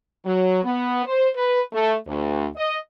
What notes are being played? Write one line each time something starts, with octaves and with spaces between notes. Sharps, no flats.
F#3
B3
C5
B4
A3
D2
D#5